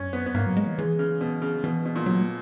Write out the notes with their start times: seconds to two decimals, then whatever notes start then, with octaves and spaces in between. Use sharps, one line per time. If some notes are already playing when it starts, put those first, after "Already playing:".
Already playing: F#2 C#4
0.13 B3
0.26 B3
0.34 G#2 A#3
0.46 F#3
0.57 G#3
0.67 E3
0.78 E3 G#3
0.99 C#3
1.21 B2
1.42 C#3
1.64 B2 E3
1.85 B2
1.96 A#2
2.06 B2 F#3
2.22 A#3